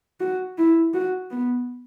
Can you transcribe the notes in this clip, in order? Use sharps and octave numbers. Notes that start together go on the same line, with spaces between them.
F#4
E4
F#4
B3